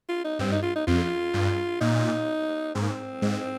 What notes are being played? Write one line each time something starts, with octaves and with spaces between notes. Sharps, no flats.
F4
D#4
G2 C4
D#4
F4
D#4
F2 F4
G2
A#2 D#4
G#2 C4
A#3
C4
G#2